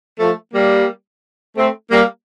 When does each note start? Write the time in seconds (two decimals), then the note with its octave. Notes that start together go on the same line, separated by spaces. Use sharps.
0.19 F3 A3
0.53 G3 A#3
1.56 A3 C4
1.91 G3 A#3